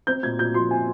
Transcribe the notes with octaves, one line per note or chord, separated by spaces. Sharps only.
C4 G6
A#2 G#6
A#2 G6
F3 C6
C4 G#5